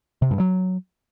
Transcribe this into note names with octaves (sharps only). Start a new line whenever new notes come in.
C3
G2
F#3